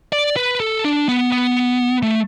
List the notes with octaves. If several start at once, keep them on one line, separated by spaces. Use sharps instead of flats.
D5
B4
A4
D4
B3
B3
A3